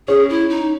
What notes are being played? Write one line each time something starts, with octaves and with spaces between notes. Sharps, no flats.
C#4 G#4
E4
D#4